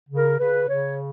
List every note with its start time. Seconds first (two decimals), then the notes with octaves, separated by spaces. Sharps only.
0.09 C#3
0.16 A#4
0.38 C#3 B4
0.69 C#3 C#5